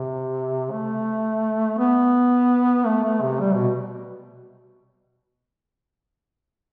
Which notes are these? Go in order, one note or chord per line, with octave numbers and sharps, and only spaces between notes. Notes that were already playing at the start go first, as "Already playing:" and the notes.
Already playing: C3
A3
B3
A3
A3
C3
G3
B2